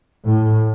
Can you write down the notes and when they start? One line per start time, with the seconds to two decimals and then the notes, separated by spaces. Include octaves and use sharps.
0.25 A2